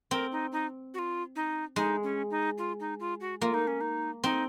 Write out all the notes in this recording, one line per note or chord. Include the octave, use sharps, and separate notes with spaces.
C4 A#4
D#4
D#4
F#4
F4
D#4
G#3 D#4
C#4
D#4
F4
D#4
F4
F#4
A#3 F4
D#4
C#4
D#4
C4 D#4